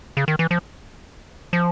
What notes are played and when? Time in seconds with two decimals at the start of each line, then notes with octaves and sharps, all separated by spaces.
0.17 C#3
0.28 D#3
0.39 E3
0.51 F3
1.53 F3